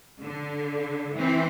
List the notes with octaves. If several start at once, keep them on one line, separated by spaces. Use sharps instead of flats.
D3
E3 C4